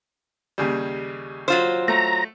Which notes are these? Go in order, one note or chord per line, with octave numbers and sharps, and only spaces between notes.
D#2 C#3 G3
F#3 F4 C5
A3 A#5